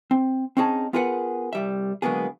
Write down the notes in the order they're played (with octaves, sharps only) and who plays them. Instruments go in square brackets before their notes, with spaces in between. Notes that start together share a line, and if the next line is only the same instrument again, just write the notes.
[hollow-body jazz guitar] C4
C4 C#4 D#4 G#4 A5
B3 F4 G#4 A#4 B4 F#5
C2 G3 E5
D3 F#3 G#3 A#3 B3 G#4